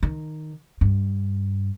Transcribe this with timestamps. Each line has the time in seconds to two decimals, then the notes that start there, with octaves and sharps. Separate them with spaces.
0.03 D#3
0.81 G2